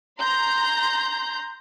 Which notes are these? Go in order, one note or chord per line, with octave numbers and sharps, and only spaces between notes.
A#5 C6 G6